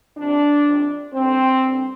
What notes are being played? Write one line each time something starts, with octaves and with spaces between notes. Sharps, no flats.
F2 C3 D4
F2 C3
G2 D3 C4
G2 D3